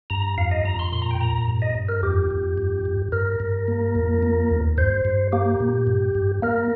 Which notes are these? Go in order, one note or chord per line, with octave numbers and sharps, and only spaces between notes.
G2 A#5
F2 F5
D#5
F2 A#5
C6
A#2 C6
A#5
G5
A#2 A#5
G2
D#5
G2
A#4
F2 G4
F2
G2
G2
G2 A#4
G2
A#3
F2
A#3
D#2
G2 C5
G2
A#3 G4
A#2
G2
G2
A#3 A#4